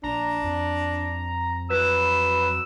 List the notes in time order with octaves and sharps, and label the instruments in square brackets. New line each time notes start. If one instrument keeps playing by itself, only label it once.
[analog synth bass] A#1 [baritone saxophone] D4 [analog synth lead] A#5
[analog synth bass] F2
[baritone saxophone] F#3 [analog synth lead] B4 [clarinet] E6